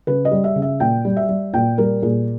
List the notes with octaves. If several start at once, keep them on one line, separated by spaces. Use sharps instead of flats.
C#3 B4
D#5
G3
E5
C#3
E5
A#2 G5
G3
E5
G3
A#2 G5
G3 A#4
A#2 G#4